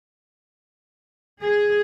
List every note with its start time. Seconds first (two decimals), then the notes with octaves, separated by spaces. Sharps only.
1.42 G#4